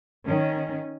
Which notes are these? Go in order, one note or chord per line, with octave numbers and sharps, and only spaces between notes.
D#3 C#4